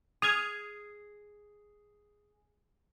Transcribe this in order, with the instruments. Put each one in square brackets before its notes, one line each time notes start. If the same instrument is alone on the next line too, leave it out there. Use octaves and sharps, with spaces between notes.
[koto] G#4 [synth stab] D#6 F6 G#6